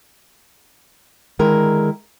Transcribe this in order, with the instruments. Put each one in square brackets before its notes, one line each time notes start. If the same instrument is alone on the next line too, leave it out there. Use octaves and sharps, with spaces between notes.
[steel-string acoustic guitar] D3 D#3 G#3 E4 A#4